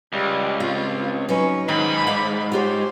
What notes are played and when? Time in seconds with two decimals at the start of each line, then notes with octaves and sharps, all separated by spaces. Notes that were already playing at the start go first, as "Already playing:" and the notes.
0.13 C#2 G3
0.60 C4 F4
1.29 F#3 C#4 D#4 B4
1.69 G#2 D#3 B5
2.07 D5 F5
2.52 F4 G4 C5 C#5